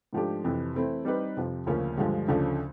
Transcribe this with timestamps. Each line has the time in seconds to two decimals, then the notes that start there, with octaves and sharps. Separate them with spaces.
0.13 G#2 F3 A3 D4 G4
0.44 F2 C3 E3
0.75 E3 A3 C4 E4
1.05 G3 C4 D#4 G4 B4
1.37 F2 C3 F3
1.66 D2 C#3 F3 A#3 C#4
1.98 G2 D3 F3 G#3
2.28 D2 C#3 F3 A3 D4